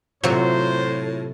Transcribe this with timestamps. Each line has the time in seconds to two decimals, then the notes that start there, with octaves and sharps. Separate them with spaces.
0.24 A2 C3 F#3 F4 F#4 C5